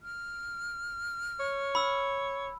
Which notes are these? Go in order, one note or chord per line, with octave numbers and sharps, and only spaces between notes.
F6
C#5
B5 E6